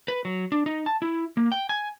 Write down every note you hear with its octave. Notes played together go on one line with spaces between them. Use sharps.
B4
F#3
D4
D#4
A5
E4
A#3
G5
G#5